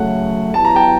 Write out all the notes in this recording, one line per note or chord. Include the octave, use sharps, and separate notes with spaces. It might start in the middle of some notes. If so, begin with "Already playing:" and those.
Already playing: C#3 F#3 A3 F#5
F#3 B3 E4 G4 A5
A#5
G5 A5